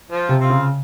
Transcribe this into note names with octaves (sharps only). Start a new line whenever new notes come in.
F3
C3
C4 F4
C#3